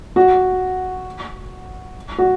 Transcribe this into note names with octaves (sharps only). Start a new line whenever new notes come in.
F#4
F#4